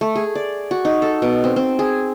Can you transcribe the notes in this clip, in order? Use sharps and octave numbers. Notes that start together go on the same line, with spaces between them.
A3
G#4
D5
F#4
D#4
A4
B2
C4
C4
G#4